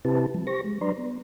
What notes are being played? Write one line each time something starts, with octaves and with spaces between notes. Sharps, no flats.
C3 C4 E4 G4 B4 A5
F3 G3
G4 C5 C#6 A#6
G#3
F#3 D4 B4 D5 A#5 C6
B3